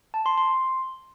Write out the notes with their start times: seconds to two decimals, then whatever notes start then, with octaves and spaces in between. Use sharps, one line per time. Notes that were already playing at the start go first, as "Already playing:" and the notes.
0.14 A5
0.26 C6
0.38 C6